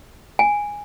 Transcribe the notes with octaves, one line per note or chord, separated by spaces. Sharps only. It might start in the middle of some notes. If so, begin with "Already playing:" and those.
G#5